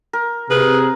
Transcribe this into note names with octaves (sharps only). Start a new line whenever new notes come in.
A#4
C3 G#4 A#4 B4